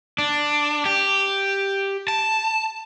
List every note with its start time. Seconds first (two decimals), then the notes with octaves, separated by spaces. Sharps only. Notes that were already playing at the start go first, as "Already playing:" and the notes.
0.18 D4
0.86 G4
2.08 A5